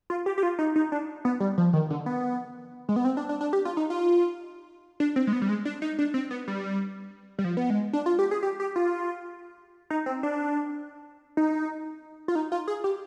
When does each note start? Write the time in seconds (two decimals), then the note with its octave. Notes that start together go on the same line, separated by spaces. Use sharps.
0.10 F4
0.26 G4
0.38 G4
0.43 F4
0.59 D#4
0.76 D#4
0.92 D4
1.25 B3
1.40 G3
1.58 F3
1.73 D#3
1.90 D3
2.06 B3
2.89 G#3
2.96 B3
3.05 C4
3.17 D4
3.29 D4
3.41 D4
3.53 G4
3.65 F4
3.77 D#4
3.90 F4
5.00 D4
5.16 C4
5.27 G#3
5.33 B3
5.42 G3
5.49 G#3
5.65 D4
5.82 D#4
5.99 D4
6.14 C4
6.31 B3
6.48 G3
7.39 G3
7.44 F3
7.57 B3
7.70 G#3
7.93 D4
8.06 F4
8.19 G4
8.31 G#4
8.43 G4
8.60 G4
8.76 F4
9.90 D#4
10.06 C4
10.23 D4
11.37 D#4
12.28 F4
12.35 D#4
12.52 F4
12.68 G#4
12.84 G4